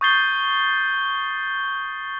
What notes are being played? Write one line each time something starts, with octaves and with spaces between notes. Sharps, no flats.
C#6 D#6 G6 A6 C7 G7